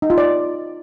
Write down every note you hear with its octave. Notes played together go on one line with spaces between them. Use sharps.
D#4
F4
D5